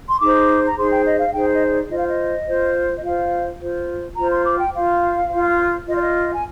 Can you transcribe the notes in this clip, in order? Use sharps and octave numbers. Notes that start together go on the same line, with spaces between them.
C6
D#4 G#4 C5 D6
A#5
D#4 G#4 C5 C6
G5
D#5
F5
D#4 G#4 C5 G5
D#5
D#5
D5
F4 C5 D#5
F5
D#5
F4 C5
D#5
F4 C5 F5
F4 C5
F4 C5 A#5
C6
D6
G5
F4 C5 F5
F4 C5
F4 C5 D#5
D5
D#5
G#5